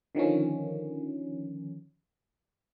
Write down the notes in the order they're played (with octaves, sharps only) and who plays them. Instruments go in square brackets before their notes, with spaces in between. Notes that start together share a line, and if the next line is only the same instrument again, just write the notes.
[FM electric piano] D3 D#3 F3 C#4